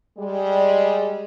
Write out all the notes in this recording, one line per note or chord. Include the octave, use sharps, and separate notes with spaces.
G3 G#3